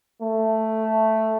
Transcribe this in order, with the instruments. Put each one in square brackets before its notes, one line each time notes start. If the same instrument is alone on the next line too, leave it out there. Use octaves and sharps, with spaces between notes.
[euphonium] A3